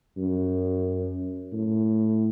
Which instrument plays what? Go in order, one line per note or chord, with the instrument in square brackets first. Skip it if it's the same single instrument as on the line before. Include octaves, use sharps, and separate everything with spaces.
[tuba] F#2
A2